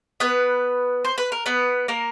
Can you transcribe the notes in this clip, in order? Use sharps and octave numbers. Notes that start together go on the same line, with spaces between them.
B3 B4
C5
B4
A#4
B3 B4
A#3 A#4